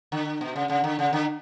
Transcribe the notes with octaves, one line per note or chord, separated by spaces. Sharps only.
D3
B2
C#3
C#3
D3
C#3
D3